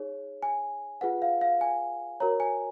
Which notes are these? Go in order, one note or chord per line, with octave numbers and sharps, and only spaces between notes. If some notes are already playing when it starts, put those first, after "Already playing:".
Already playing: D#4 G#4 C#5
G#5
F4 G#4 B4 F#5
F5
F5
G#5
F#4 A#4 C#5 A#5
G#5